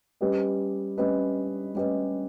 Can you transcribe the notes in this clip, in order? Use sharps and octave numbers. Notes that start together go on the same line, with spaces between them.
G3 C#4 G4 B4 D#5
G3 C#4 G4 B4 D#5
G3 C#4 G4 B4 D#5